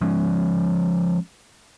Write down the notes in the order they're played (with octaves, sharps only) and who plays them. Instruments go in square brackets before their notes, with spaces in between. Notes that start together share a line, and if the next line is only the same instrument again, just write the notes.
[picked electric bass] F3 G#3 C#4